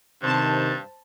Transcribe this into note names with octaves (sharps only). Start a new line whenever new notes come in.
G2 C3 D#3 C5 A5